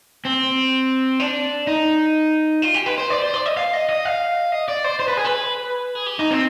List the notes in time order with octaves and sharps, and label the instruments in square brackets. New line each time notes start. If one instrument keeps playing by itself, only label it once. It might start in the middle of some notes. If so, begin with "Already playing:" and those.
[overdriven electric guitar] C4
D4
D#4
F4
G4
B4
C5
D5
C5
D5
D#5
F5
D#5
D#5
F5
D#5
D5
C5
C5
B4
G#4
B4
G#4
G4
D#4
C4